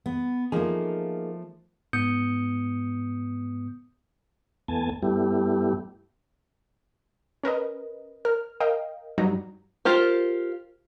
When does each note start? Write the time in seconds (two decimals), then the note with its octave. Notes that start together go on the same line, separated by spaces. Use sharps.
0.06 B3
0.52 F3 A3 A#3 D#4 G#4
1.93 G#2 B3 D#6 G6 C#7
4.68 E2 A3 B3 G#5 A5
5.02 G2 G3 A3 B3 E4 G4
7.43 C#4 A#4 B4 D#5
8.25 A#4 F6
8.60 A#4 D#5 F5 G5
9.18 G2 F#3 G3 D#4 A#5
9.85 F4 G4 A#4 C5